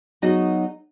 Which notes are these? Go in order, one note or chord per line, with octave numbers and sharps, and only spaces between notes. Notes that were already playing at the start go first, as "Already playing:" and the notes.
F#3 B3 D#4 F#4 G#4 D#5